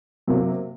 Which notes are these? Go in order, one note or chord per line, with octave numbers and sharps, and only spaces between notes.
C3 F#3 A#3